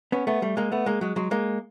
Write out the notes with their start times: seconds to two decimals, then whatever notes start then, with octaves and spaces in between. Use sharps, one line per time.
0.12 B3 C#4
0.27 A3 B3
0.42 G3 A3
0.57 G#3 A#3
0.72 A3 B3
0.86 G#3 A#3
1.01 F#3 G#3
1.16 F#3 G#3
1.31 G#3 A#3